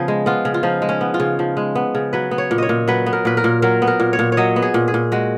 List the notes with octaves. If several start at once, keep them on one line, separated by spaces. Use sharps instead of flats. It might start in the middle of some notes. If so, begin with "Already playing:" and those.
Already playing: C#3 F3 B3 G#4
G#3
B3 F4
C#3
F4
F3 D#4
G#3
C#4
B3
F4
C#3
F3
G#3
B3
C#3
F#3 B4
B3
C#5
A#2
C#5 D#5
A#2
F#3 B4
B3
A#4
A#2 B4
A#4
A#2
F#3 A#4
B3
A#4
A#2
C#5
A#2
C#5
F#3 D#5
B3
G#4
A#2
G#4
A#2
G#3 F#4